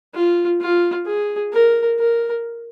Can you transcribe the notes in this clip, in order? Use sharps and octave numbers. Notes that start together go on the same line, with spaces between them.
F4
F4
G#4
A#4
A#4